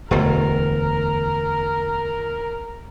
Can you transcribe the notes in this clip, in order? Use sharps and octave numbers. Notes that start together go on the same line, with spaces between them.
E1 D2 A#4